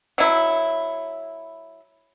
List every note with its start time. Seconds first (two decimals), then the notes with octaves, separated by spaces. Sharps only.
0.18 F#3 E4